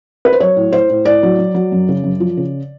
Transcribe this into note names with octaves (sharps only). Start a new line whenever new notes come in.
B4
C5
F#3 C#5
A2
A2 C5
A2
A2 D5
F#3
F#3
F#3
F#2
C#3
F#2
F3
C#3